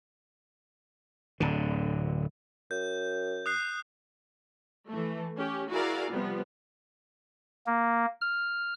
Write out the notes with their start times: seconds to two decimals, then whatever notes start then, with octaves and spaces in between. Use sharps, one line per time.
1.40 D1 D3
2.71 F#2 G6
3.46 D#6 F#6 C7
4.88 E3 A3
5.37 C#4 G4
5.70 E4 F#4 G#4 A#4 D5 F5
6.11 C3 F3 G3 B3
7.67 A#3
8.21 F6